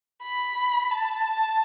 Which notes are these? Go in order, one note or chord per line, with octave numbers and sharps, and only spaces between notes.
B5
A5